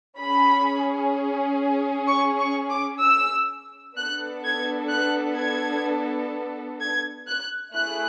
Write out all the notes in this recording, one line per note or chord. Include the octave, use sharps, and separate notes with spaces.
C#4 G#4 B5
C#6
C#6
D6
E6
B3 D4 A4 F#6
G#6
F#6
G#6
G#6
F#6
A3 E4 G#4 F#6